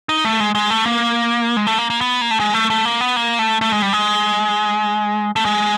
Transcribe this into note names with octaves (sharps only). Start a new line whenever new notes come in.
D#4
A3
G#3
G#3
A3
A#3
G#3
A3
A#3
A#3
B3
A#3
A3
G#3
A3
A3
A#3
B3
A#3
A3
A3
G#3
G3
G#3
A3
G#3